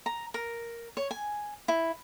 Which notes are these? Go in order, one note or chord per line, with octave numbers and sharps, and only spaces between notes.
A#5
A#4
C#5
G#5
E4